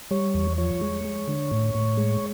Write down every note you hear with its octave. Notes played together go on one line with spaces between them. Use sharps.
G3 C#5
E2
F3 C#5
G#3
G#3
D3
A2
A2
G#3